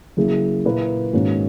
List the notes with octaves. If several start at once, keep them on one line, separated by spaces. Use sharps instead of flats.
C#3 F#3 A#3 E4 G#4
A#2 A#3 E4 B4
G#2 D#3 A#3 C#4 F#4